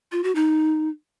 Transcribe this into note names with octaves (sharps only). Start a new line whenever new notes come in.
F4
F#4
D#4